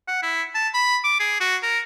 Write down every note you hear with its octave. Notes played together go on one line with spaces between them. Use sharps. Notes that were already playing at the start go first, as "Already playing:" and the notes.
F#5
E4
A5
B5
D6
G#4
F#4
A#4